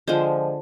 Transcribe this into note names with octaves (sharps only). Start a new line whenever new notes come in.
D3 F3 G#3 C5